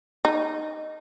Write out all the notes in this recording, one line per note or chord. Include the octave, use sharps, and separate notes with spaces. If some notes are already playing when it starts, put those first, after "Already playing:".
D#4